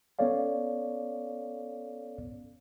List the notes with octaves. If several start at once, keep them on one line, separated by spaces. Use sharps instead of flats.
B3 C#4 A4 C#5 D5 F5